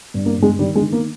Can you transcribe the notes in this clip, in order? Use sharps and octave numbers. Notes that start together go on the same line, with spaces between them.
G2
A#3
G2
G#3
D#3 G3
G#3
D#3
A#3